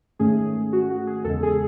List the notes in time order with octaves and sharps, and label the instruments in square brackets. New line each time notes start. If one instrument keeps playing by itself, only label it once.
[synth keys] G#2 D#3 A3 C#4 G#4
F#4
F#4
G#4
E2 C#3 G#3 A4
G#4